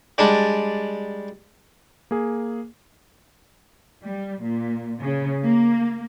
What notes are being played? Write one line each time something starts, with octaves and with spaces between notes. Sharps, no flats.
G3 G#3 D4
A#3 G#4
G3
A#2
C#3
A#3